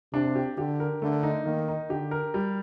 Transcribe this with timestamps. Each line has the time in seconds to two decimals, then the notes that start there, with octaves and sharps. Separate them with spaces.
0.13 C3 D4
0.35 G4
0.57 D3 G4
0.80 A#4
1.01 D3 A3
1.23 D#4
1.45 D#3 A#3
1.68 D#4
1.90 D3 G4
2.11 A#4
2.34 G3